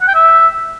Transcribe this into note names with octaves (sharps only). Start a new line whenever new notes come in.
F#5
G5
E5